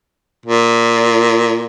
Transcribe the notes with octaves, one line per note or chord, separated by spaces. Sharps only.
A#2